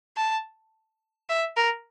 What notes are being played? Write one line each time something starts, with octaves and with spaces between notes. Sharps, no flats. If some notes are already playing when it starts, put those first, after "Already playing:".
A5
E5
A#4